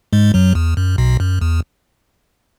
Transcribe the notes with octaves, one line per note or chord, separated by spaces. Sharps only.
G#2 G#3
F#2 F#3
E2
F#2
B1 B2
F#2
E2